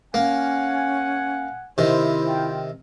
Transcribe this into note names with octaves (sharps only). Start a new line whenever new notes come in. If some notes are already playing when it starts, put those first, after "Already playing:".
A#3 C#4 F#5 G#5
C3 D#3 E4 C5
F4 G5